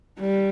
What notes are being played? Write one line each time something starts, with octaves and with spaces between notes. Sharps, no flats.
G3